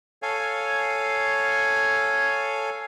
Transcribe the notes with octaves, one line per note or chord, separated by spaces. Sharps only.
A4 C#5 F5 G#5